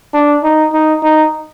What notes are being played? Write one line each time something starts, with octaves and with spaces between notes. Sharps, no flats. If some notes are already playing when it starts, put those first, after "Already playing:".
D4
D#4
D#4
D#4